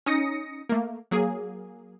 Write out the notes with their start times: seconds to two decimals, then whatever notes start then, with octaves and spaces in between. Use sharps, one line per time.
0.06 C#4 D#4 D#6 A#6 C#7
0.69 A3 A#3
1.11 F#3 A#3 G#4